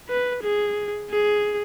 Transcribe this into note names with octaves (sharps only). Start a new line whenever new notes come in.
B4
G#4
G#4